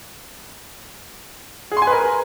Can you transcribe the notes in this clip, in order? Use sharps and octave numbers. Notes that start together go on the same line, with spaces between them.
G#4
C6
G#5
B4
A#4